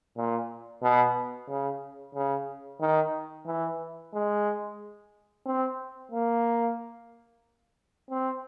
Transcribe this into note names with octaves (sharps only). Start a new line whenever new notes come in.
A#2
B2
C#3
C#3
D#3
E3
G#3
C4
A#3
C4